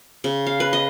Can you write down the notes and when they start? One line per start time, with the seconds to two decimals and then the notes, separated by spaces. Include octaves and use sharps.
0.24 C#3
0.46 F5
0.60 B4
0.73 D#5